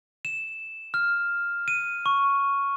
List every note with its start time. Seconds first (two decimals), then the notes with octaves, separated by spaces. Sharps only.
0.25 E7
0.94 F6
1.68 D#7
2.06 C#6